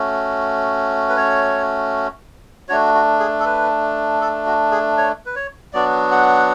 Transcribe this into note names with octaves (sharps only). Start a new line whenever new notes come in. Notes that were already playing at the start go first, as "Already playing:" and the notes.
Already playing: A3 C#4 F#4
B4
C#5
A3 D4 F#4 C#5
F#4
G#4
A4
B4
A4
F#4
G#4
C#5
B4
C#5
F#3 B3 D4 F#4 D5
F#5